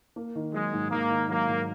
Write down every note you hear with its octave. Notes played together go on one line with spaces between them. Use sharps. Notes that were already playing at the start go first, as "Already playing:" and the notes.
A#3
D#3
F#3 G#3
G#2
G#2 A#3
D#3
F#3 A#3
G#2